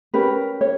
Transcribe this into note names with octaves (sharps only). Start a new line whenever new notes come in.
C#4 G4 A#4 B4
C#5